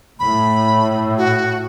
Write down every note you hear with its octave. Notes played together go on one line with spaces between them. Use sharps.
A2 B5
F#4